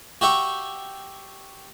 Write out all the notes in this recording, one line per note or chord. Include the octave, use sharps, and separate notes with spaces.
F#4 G4 E5 C#6